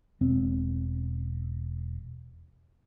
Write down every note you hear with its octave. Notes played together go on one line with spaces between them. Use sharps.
E1 C4